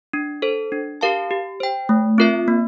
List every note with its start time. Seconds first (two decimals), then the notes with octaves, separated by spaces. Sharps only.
0.13 D4
0.42 A4 C5
0.72 D4
1.01 G4 A#4 F5 A5
1.31 G4
1.60 C5 G5
1.89 A3
2.18 C4 F4 A#4 E5
2.48 A#3